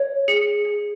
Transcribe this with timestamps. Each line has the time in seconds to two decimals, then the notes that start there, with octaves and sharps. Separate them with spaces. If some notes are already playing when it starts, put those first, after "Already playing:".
Already playing: C#5
0.28 G#4 C#7
0.65 G#4